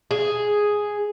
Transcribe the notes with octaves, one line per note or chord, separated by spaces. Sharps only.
G#4